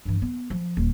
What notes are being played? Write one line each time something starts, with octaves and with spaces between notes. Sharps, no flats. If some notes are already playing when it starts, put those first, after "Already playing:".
G2 E3
B3
F3
D#1